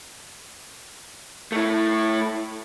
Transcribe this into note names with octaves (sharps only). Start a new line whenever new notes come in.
A3 E4